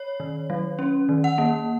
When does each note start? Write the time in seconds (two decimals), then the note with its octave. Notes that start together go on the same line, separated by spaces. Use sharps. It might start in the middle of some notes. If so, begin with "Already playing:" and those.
Already playing: C#5
0.20 D#3
0.50 F#3
0.79 C#4
1.09 D#3
1.24 F#5
1.38 A#3